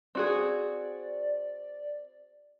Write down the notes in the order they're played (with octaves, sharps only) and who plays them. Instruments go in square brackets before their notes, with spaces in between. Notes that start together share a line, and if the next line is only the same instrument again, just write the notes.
[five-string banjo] C4 F#4 G#4 [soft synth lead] D5